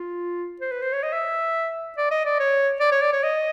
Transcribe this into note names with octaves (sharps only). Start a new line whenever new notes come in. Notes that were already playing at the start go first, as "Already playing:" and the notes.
Already playing: F4
C5
B4
C5
C#5
D#5
E5
D5
D#5
D5
C#5
D5
C#5
D5
C#5
D#5